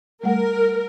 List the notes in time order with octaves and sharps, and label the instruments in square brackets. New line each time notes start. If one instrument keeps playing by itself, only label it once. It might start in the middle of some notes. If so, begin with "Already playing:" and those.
[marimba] G3 A3 F#5 [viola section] A#4